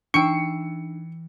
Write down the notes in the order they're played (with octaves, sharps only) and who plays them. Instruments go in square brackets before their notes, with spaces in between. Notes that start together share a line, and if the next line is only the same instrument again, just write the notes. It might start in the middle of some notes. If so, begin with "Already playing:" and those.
[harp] E3 E6 C7 [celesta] D4 D#4 [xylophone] G5 C#6 [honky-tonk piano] C#7